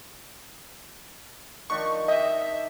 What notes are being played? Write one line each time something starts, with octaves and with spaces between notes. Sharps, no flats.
D#3 F3 D4 C#6
G4 D#5 E5